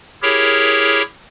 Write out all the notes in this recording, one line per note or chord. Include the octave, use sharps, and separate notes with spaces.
E4 G4 G#4 A#4 C#5